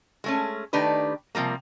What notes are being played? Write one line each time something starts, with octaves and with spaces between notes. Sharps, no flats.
G#3 A3 C#4
D#3 A3 D4 G4 B4
C3 F3 G3 A#3